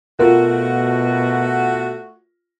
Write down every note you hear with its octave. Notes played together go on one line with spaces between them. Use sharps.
B2 A3 F4 F#4 A#4